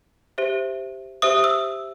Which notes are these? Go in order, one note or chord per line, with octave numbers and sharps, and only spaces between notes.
G4 C5 E5
G4 C5 E5 D#6
E6